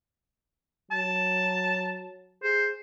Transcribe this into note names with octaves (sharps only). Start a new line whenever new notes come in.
F#3 A5
G#4 C5